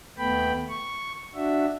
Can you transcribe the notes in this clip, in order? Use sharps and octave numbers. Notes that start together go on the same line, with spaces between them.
D#2 A3 B3 G5 B5
C#6
D4 F#4 E5